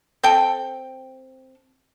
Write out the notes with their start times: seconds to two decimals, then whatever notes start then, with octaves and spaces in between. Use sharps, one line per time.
0.23 C4 A4 G5